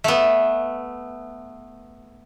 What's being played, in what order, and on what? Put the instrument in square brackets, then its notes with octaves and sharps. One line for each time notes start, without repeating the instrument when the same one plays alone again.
[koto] A3 B3